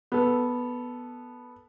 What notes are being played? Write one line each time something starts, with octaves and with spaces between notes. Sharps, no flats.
B3 A4